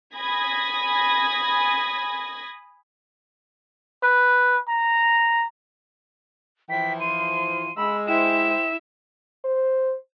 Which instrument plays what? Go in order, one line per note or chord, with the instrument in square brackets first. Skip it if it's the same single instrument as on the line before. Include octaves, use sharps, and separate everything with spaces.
[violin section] G#5 B5 D#6 G#6 A#6
[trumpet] B4
A#5
[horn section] E3 F3 [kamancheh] G5 [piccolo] B6
[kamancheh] C6 [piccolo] D#7
[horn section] G#3 [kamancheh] B5 E6
[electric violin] E4 E5 [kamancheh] C5 G5 [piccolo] E7
[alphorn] C5